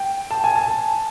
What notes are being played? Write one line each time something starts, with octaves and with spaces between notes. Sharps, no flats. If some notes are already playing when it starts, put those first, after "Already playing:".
Already playing: G5
A5
G#5
A5